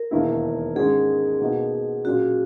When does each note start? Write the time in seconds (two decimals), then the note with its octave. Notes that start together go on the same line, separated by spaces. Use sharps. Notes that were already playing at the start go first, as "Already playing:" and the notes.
Already playing: A#4
0.11 E1 D#2 D#3 A#3 E4
0.76 G#2 D#3 G#3 C#4 G#4
1.41 B2 A#3 D#4 F#4
2.05 A#2 F#3 C#4 F#4